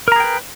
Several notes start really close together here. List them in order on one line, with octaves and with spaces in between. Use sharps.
A#4 A#5 G#4 G5 B4